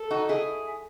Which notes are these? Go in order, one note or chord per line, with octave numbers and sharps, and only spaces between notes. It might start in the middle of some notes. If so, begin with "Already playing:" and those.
Already playing: A4
D#4 F#4
E4 G#4